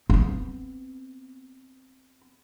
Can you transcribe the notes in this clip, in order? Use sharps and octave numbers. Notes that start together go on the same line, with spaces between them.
B3 C4